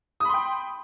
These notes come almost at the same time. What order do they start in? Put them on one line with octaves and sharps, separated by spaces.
D#6 B5 C6 G5